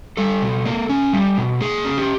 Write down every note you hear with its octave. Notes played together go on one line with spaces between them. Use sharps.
G3 A4
B2
A#3
C#4
G3
B2
A#3 G#4
C#4
G4